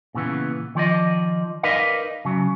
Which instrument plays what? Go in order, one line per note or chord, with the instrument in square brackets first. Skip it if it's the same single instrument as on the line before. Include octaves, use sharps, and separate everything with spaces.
[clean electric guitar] A#2 C#3 E3 B3
D#3 F3 D5 D#5
D#4 A#4 B4 D5 D#5 F5
C#3 F#3